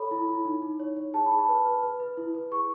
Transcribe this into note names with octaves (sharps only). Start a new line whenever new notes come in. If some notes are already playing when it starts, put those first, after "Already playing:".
Already playing: A4 C#5 B5
E4
E4
D#4
D#4
C#5
C#5
G#4 A5
B5
G#4
A5
B4
B4
B4
B4
E4
B4
G#4 C#6